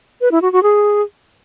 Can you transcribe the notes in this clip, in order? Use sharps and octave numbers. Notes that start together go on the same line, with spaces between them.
B4
E4
F#4
F#4
G#4